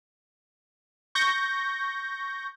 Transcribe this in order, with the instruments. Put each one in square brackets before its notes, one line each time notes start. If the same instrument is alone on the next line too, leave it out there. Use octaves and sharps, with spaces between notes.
[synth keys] C#6 G6 A#6